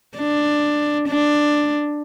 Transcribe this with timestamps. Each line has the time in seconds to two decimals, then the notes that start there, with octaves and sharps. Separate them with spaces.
0.17 D4
1.08 D4